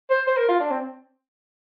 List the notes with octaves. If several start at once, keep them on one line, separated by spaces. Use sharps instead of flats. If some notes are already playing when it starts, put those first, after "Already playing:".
C5
C5
A#4
F4
D4
C4